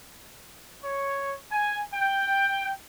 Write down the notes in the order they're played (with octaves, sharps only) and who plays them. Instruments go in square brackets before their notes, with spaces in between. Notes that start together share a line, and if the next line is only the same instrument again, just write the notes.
[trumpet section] C#5
G#5
G5